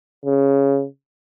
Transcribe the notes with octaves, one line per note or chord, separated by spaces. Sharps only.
C#3